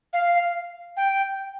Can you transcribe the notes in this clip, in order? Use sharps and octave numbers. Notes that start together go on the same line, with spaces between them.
F5
G5